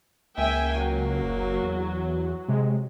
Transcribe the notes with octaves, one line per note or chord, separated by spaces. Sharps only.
C#2 A#3 E5 G5 G#5
F#3
F#1
E2
C3 G#3